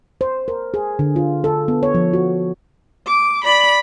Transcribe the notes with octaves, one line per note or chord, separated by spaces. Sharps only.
C5
A#4
G#4
D3
F4
A4
B3
C#5
F3
F#4
D6
D5 B5